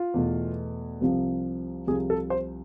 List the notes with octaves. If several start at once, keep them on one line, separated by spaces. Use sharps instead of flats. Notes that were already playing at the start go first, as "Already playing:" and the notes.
Already playing: F4
E2 B2 A3
C2 C3 F3
C2 C3 F3 G#4
A4
C5